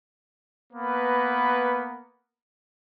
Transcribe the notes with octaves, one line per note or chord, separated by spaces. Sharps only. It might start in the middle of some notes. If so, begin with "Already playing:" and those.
A#3 B3 A#4 B4